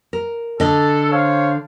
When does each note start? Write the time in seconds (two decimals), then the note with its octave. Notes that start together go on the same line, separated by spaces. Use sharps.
0.13 A#4
0.60 D3 A4 D#5
1.11 C5 C#5 F5